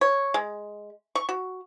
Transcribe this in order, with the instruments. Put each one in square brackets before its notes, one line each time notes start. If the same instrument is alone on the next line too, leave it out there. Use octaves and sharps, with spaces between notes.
[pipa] C#5
G#3
C#6
F#4